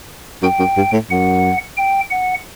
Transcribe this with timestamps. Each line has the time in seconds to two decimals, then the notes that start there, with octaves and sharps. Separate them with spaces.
0.43 F#2 G5
0.59 F#2
0.77 G2
0.93 A2
1.10 F#2 F#5
1.77 G5
2.10 F#5